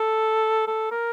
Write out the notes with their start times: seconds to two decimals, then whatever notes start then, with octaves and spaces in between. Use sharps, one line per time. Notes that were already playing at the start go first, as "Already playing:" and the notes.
Already playing: A4
0.67 A4
0.92 A#4